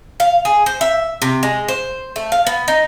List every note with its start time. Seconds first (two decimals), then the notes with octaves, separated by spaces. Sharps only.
0.20 F5
0.45 G#4
0.66 C5
0.81 E5
1.22 C3
1.43 G#3
1.68 C5
2.16 A3
2.32 F5
2.47 B3
2.68 D#4